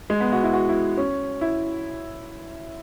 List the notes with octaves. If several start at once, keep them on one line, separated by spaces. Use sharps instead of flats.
G#3
B3
F#4
E4
F#4
E4
C#4
E4